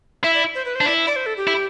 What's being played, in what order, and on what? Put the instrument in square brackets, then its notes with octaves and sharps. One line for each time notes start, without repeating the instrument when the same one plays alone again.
[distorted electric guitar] E4 [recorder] E5
[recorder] D5
C5
B4
C5
[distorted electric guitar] D4
[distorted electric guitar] E4 [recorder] D5
[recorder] D5
C5
A4
G4
[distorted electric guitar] E4